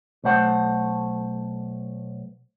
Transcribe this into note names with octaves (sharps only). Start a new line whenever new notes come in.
B1 A3 C5 F#5 A5